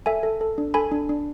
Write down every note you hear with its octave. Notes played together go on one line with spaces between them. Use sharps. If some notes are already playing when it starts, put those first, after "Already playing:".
A4 E5 G#5
A4
A4
D4
A4 G#5 B5
D4
D4